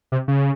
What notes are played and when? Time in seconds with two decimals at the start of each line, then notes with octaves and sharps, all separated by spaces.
0.12 C3
0.28 C#3